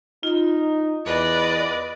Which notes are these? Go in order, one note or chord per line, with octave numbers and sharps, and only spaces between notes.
D#4 F4
E2 B4 D5 D#5